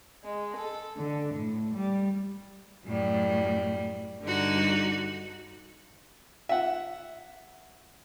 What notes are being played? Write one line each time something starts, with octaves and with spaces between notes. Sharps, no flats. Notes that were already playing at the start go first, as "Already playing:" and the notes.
G#3
A4
D3
A2
G3
F#2 A2 G3
G2 D3 D#4 F#4
E5 F#5